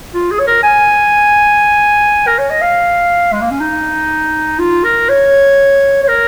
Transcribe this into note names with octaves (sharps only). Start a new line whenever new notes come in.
F4
G#4
C#5
A#4
G#5
A#4
C#5
D#5
F5
G#3
A#3
C#4
D#4
F4
A#4
C#5
C#5
A#4